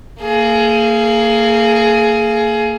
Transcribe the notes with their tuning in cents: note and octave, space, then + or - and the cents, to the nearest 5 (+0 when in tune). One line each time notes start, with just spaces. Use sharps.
A#3 -30 G#4 +15